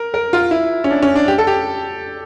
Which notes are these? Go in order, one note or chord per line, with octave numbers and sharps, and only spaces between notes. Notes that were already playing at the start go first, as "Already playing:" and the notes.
Already playing: A#4
A#4
F4
E4
C#4
D4
C#4
D4
G4
A4
G4